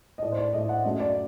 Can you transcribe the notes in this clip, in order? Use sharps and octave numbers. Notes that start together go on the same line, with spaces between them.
D#5
A2 A3 D5
C5
D5
A2 A3 D#5
F#5
F#2 F#3 A3 D#5
D5